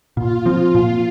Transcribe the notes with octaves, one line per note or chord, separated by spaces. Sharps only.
A#2 F4
F3 C4
A#2